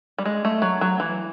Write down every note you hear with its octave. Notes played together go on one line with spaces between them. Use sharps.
G3
G#3
A3
F#3
F#3
E3